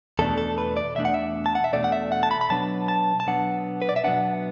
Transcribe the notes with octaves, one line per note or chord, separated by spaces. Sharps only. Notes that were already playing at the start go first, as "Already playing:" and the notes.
E2 B2 A3 D4 A4
A4
B4
D5
E2 B2 A3 D4 E5
F#5
E5
A5
F#5
E5
E2 B2 A3 D4 D5
F#5
E5
F#5
A5
B5
B5
B2 F#3 B3 D4 A5
A5
A5
B2 F#3 B3 D4 F#5
B4
D5
E5
B2 F#3 B3 D4 F#5